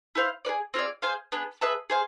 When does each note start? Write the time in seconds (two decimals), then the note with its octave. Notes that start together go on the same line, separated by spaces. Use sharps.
0.15 E4 A4 C5 F5
0.45 B4 D5
0.49 G#4
0.74 C4 F4 G#4 D5
1.02 G#4 C5 F5 G#5
1.32 B3 D4 G#4
1.61 G#4 B4 E5 A5
1.90 G#4 C5 F5